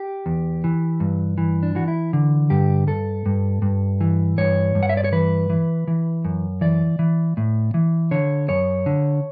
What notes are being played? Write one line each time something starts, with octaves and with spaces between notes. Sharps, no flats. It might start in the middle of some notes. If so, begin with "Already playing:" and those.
Already playing: G4
E2
E3
G2
E3
D4
E3 F#4
E4
D3
G2 G4
G2 A4
G2
G2
E3
G2 C#5
G2
F#5
E5
D5
C#5
E3 B4
E3
E3
F#2
E3 D5
E3
A2
E3
D3 C#5
F#2 C#5
D3